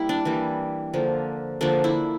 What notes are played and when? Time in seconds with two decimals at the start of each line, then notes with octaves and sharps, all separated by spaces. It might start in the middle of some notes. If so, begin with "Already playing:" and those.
Already playing: G3 A#3 E4
0.09 D4
0.25 E3 G3 A#3
0.93 D3 F3 A#3
1.61 D3 F3 A#3 D4
1.84 E4